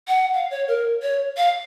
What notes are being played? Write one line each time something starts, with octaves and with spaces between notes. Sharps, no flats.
F#5
F5
C#5
A#4
C#5
F5